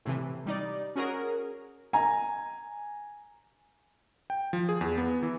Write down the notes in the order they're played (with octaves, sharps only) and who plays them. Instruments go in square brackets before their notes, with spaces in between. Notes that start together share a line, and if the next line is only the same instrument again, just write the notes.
[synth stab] A2 C3 E3
G3 D#4 D5
C#4 F#4 G#4 A#4
[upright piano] G#5 A#5
[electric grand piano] G5
F3
G#4
E2
B3
E3